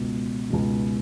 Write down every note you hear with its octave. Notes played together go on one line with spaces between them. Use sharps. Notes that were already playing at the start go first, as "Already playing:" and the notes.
Already playing: C#2 B2
C#2 B2